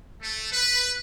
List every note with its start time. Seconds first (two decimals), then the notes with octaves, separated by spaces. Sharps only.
0.21 A3
0.51 B4